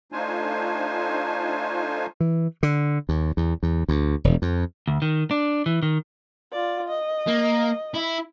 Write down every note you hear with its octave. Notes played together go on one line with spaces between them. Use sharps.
A3 D4 D#4 F4 C5 G#5
E3
D3
D#2
E2
E2
D2
E1
F2
D2
D#3
D4
E3
D#3
F4 D5
D#5
A#3
E4